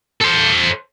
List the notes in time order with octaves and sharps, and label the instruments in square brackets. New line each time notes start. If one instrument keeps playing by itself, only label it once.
[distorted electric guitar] A4 C5